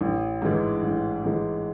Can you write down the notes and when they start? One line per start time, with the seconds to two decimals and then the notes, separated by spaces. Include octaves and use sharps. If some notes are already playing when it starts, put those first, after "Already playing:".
0.01 A1
0.42 G#2 E3 G#3
0.83 A1
1.24 G#2 E3 G#3